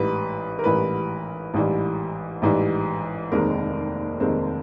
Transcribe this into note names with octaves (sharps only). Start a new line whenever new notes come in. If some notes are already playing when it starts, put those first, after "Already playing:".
Already playing: A1 G#2 E3 G3 B4
A#4
A1 G#2 E3 G3 B4
A1 G#2 E3 G3
A1 G#2 E3 G3
F1 D#2 D#3 G#3 C4 A#4
F1 D#2 D#3 G#3 C4